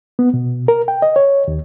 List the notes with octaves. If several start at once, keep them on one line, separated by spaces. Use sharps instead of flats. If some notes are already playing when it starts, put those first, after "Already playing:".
B3
B2
A#4
G5
D#5
C#5
D#2